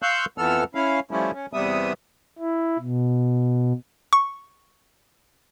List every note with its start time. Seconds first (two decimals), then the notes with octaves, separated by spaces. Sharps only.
0.02 F5 C6 C#6 E6 F#6 G6
0.38 F2 E3 B3 A4 E6 F6
0.75 C#4 E4 F5
1.11 F3 G3 A3 C#4 E4
1.34 C#4
1.53 E2 C3 G3 B3 E5 D#6
2.39 E4
2.79 B2
4.13 C#6